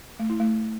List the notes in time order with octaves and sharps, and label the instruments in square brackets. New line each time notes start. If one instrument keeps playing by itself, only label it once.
[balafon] A3
E4
A3